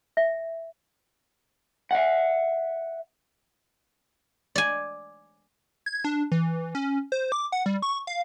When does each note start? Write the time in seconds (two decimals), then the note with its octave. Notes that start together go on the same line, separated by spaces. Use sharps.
0.17 E5
1.91 E5 F#5
4.55 D5 G#5
5.86 G#6
6.05 D4
6.32 E3
6.75 C#4
7.12 C5
7.32 D6
7.52 F#5
7.66 G3
7.82 C#6
8.07 F5